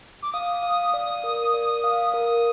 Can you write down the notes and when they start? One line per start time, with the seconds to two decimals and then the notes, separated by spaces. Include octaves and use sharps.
0.23 D6
0.33 F5 D#6
0.63 F5
0.94 D5
1.24 A#4
1.54 D5
1.84 F5
2.13 A#4 D#6